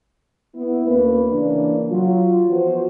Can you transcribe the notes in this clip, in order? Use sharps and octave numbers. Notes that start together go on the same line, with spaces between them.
B3 E4
D2 A#3 C#4 B4
C#3 E3 A#3 D4
F#3 F4
E3 F3 B3 F4 F#4 C5